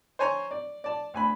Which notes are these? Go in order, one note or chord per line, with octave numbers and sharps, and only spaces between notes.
C5 C#5 G#5 A#5 C#6
D5
D5 A5
D2 G#5 B5